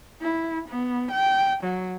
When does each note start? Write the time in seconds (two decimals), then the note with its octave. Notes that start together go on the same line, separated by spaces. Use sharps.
0.22 E4
0.69 B3
1.12 G5
1.64 F#3